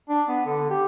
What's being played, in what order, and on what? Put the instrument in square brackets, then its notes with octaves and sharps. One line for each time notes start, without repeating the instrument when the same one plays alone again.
[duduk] D4
B3
D3
G4